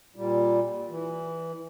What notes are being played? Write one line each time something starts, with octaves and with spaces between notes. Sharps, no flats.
A#2 G3
E3